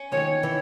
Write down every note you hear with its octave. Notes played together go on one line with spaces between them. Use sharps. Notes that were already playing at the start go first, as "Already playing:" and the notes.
Already playing: C#4
D#3 C#5
E3